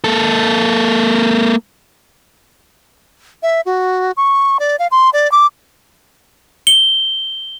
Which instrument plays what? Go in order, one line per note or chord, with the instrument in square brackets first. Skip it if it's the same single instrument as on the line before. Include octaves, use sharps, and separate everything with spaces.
[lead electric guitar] A#3 A4
[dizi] E5
F#4
C#6
D5
F5
C6
D5
D6
[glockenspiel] G7